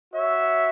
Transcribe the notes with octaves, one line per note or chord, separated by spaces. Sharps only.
F#4 C#5 E5